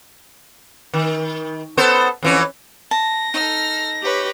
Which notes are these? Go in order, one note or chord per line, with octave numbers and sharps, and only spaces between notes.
D#3
B3 A4 C5
F2 E3 C#4
A5 A#6
D#4 A4 F6
G4 B4 C#5